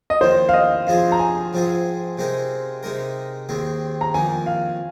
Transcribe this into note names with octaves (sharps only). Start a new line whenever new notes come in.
D#5
F2 D#3 A#3 C5
F5
D#5
F2 F3 C4 G#4 C5 F5
A#5
G#5
G#2 F3 C4 G#4
C3 G#3 C4 D#4 A#4
C3 G#3 D#4 A#4
D#2 D#3 G#3 C4
A#5
F2 D#3 A#3 G#5
F5